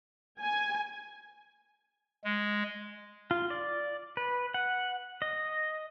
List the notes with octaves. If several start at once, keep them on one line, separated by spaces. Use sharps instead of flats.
G#5
G#3
F4
D5
B4
F#5
D#5